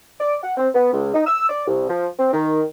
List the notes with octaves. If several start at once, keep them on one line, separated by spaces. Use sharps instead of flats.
D5
F#5
C4
B3
C#2
D#4
E6
D5
C2
F3
C4
D#3